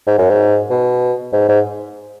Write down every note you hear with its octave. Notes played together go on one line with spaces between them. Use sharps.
G#2
F#2
G#2
B2
G#2
G#2